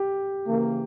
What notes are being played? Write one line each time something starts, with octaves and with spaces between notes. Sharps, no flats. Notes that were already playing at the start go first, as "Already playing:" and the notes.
Already playing: G4
C#3 E3 A#3